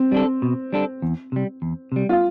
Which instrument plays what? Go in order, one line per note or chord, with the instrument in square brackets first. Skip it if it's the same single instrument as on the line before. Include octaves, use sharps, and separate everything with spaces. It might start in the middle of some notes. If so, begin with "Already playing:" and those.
Already playing: [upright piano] C4
[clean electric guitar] G3 D4 A4
B2
G3 D4 A4
E2
C3 G3
E2
C3 G3
[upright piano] F4